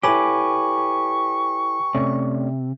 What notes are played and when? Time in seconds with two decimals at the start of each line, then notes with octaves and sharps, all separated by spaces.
0.04 E4 G4 A4 B4 C#5 G#5 C#6 D6
1.95 C3 A3 C#4 D5